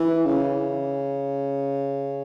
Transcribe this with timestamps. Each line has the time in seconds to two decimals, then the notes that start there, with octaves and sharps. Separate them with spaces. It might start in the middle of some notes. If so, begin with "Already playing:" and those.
Already playing: E3
0.25 C#3